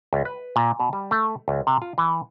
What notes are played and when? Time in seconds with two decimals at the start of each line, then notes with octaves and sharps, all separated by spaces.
0.13 C#2
0.25 B4
0.56 A#2
0.79 B2
0.93 G3
1.11 A3
1.48 C#2
1.67 C3
1.82 F4
1.98 E3